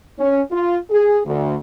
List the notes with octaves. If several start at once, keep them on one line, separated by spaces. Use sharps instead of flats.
C#4
F4
G#4
D2